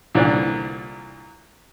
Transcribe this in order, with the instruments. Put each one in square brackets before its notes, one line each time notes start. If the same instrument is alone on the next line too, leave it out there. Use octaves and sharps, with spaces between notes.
[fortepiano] C2 A#2 D3 E3 D4